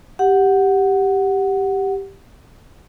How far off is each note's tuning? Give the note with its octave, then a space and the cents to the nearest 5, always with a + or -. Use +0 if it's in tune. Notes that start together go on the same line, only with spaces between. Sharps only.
G4 +0 F#5 +0